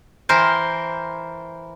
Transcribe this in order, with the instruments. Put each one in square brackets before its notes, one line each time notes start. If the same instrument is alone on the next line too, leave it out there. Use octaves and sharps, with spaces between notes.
[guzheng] E3 A#4 C5 G5